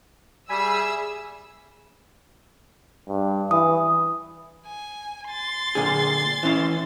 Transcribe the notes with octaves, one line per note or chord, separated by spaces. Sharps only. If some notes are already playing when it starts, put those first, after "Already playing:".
G3 G#4 E5 G#5 B5 E6
G2
E3 D#6
G#5
C6 A6
A#2 D3 G#4
E3 C#4 E4